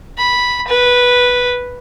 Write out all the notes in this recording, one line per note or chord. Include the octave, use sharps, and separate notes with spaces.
B5
B4